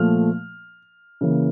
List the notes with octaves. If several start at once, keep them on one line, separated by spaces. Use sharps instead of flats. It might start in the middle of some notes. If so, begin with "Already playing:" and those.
Already playing: A#2 F3 A3 F6
C#3 E3 A#3